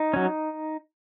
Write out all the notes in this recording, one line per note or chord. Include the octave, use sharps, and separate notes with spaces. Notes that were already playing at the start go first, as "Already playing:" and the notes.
Already playing: D#4
F#3 C#4